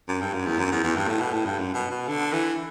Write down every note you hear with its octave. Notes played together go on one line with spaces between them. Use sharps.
F#2
G2
F#2
E2
F#2
E2
E2
G2
A2
B2
A2
G2
F#2
B2
B2
D3
E3